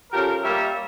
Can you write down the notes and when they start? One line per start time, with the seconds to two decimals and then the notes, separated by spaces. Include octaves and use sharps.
0.12 F3 C#4 G4 A4 A#4
0.43 G3 A#3 C#5 E5